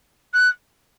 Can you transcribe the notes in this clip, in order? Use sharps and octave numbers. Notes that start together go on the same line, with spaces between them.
F#6